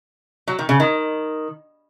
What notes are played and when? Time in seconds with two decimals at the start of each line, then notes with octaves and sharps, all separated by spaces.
0.47 F#3
0.59 D#3
0.69 C#3
0.80 D#3